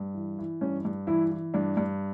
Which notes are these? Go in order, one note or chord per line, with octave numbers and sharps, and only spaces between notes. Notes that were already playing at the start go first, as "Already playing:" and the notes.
Already playing: G2
E3
E3
G2 C#4
G2
E3 E4
E3
G2 D4
G2